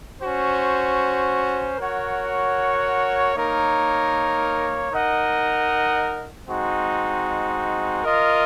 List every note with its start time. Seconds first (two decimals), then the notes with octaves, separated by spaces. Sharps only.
0.21 C#4 F#4 C5
1.78 F#4 A#4 C#5 F#5
3.35 A#3 D#4 A#4 C#5
4.91 D#4 A#4 D#5 F#5
6.48 G#3 C4 D#4 F#4
8.04 F4 A#4 D#5